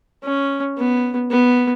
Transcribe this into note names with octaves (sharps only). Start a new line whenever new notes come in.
C#4
B3
B3